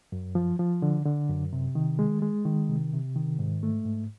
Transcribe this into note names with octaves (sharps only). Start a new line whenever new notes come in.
F#2
F3
F3
D3
D3
F#2
C3
D#3
G#3
G#3
D#3
C3
C3
D#3
G#2
A3
G#2